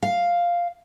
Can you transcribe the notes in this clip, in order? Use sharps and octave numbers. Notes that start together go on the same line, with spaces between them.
F5